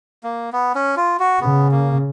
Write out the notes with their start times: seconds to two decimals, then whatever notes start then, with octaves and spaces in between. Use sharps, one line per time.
0.23 A#3
0.53 B3
0.75 C#4
0.97 F4
1.20 F#4
1.41 C#3 B3
1.71 A#3